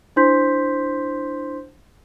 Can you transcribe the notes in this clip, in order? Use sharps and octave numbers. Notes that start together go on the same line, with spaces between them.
D4 E4 C5 C6 G6 B6